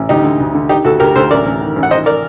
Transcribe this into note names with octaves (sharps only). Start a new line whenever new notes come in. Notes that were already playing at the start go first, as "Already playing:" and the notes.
Already playing: A1
D2 D#4 G4
D3
D2
D3
D#3 D#4 G4
D2 F#4 A4
D2 G4 A#4
D2 A4 C5
A1 A#4 D5
A1
D#3
A1
F#5
D#3 C5 D#5
A#4 D5